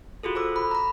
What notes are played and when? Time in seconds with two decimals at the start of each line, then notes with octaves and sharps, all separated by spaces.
0.23 F4 F#4 G#4 A4
0.35 A4 C5 D6 E6
0.56 B5
0.71 A#5 B5